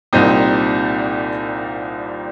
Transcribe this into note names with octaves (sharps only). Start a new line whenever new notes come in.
C2 A#2 G3 C4 D#4